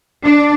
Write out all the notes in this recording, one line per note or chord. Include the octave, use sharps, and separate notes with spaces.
D4